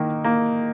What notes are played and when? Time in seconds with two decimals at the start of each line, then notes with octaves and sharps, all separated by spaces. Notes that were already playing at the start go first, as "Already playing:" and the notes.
Already playing: D#3 A#3
0.24 A#3